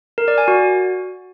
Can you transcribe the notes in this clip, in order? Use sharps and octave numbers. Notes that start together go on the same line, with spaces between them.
A#4
D5
G#5
F#4